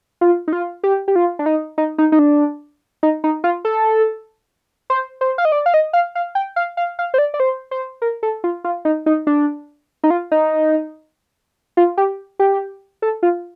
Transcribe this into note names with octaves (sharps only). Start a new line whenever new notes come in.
F4
D#4
F4
G4
G4
F4
D4
D#4
D#4
D#4
D#4
D4
D#4
D#4
F4
A4
C5
C5
F5
D#5
D5
F5
D#5
F5
F5
G5
F5
F5
F5
C5
D5
D5
C5
C5
A#4
A4
F4
F4
D#4
D#4
D4
D#4
F4
D#4
F4
G4
G4
A4
F4